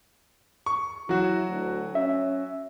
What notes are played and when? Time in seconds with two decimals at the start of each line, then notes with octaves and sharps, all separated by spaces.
0.66 C#6
1.09 F#3 E4 F#4
1.48 D2
1.95 C#4 E5